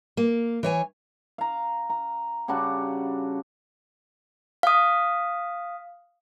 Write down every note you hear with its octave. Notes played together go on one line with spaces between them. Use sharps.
A#3
E3 C#5 G#5
F5 A#5
A#5
C#3 G3 D4 F#4
F5 D#6